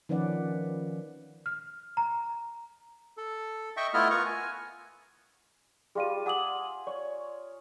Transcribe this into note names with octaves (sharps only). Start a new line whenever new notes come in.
D#3 F3 C#4 B4 D5 F#5
F6
A#5
A4
D#5 E5 G5 C#6
A3 B3 E4 F4 D#5 F6
F4 A#4 B4 A#5 C#6
G#5
G3 F4 G#4 D5 F5 D#7
F#5 G#5 A#5 D6 D#6 F#7
C#5 D5